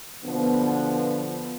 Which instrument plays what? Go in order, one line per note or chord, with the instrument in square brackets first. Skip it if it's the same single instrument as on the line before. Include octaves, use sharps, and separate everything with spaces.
[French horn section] B2 D3 F3 B3